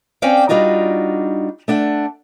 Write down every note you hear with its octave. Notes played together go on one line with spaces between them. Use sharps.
C4 C#4 C5 D5 F5 G5
G3 D4 D#4 F4 F#4
A3 D4 F#5